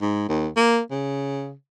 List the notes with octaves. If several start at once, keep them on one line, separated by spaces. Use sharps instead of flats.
G#2
D#2
A#3
C#3